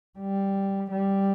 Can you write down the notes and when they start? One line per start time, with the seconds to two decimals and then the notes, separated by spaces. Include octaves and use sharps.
0.19 G3
0.91 G3